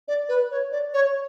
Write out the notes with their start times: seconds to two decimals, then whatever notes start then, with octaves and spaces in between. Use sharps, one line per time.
0.08 D5
0.29 B4
0.51 C#5
0.72 D5
0.94 C#5